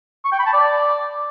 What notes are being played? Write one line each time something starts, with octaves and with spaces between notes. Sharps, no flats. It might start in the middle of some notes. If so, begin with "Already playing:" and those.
C#6
G5
B5
A5
D5